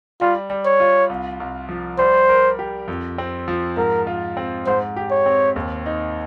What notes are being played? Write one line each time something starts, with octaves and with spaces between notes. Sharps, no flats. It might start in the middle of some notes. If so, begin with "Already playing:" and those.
G3 F4
G3
C#5
F4
C2
C2
F3
G3 C5
A#4
G4
F2
C4
F3
G#2 A#4
F4
C4
G#2 C5
G4
C#5
C4
D#2
D#4